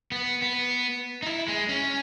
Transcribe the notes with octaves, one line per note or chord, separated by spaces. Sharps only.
B3
B3
D#4
E4
G#3
C#4